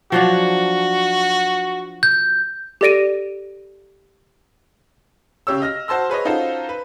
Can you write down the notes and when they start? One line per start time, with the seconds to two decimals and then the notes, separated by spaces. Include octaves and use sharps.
0.12 F3 F#3 D4 F#4
2.03 G6
2.81 G4 A4 D5 A#6 D7 D#7
5.47 C#3 G4 C#5 E6
5.62 D#5 F6 A#6
5.88 F#4 C5 A5 C6 E6
6.09 G#4 B4 C#5 D#5
6.25 C#4 D#4 F4 F#4 A4 C5
6.69 B4